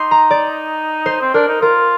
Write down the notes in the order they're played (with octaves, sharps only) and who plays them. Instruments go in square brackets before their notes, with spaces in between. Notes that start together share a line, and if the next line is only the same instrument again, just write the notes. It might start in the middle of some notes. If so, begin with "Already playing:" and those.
Already playing: [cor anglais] D#4 [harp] C6 D6
[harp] A#5
D5
C5
[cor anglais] C4
[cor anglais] D4 [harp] A#4
[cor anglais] D#4
[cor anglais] F4 [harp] A#4